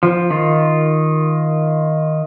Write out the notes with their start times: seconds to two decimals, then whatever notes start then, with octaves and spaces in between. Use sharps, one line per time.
0.03 F3
0.30 D#3 F4